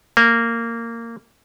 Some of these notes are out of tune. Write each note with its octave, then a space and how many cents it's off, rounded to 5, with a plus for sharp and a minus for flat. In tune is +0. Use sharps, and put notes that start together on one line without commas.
A#3 -15